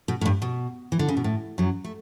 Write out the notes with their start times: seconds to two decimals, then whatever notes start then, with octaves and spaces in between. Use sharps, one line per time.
0.08 B2
0.21 A2
0.25 G2
0.42 B2
0.92 E3
0.99 D3
1.08 C#3
1.17 B2
1.24 A2
1.58 F#2 F#3
1.84 A3